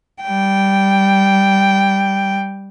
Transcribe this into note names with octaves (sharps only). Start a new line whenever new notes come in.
G3 G5